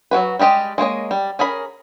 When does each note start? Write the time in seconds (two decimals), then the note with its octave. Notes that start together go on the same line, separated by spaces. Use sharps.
0.11 F#3 A#3 F#4 B4
0.39 G3 G#3 G4 D#5
0.78 G#3 A#3 C#5 D#5
1.11 G3
1.39 C#4 G#4 A#4 B5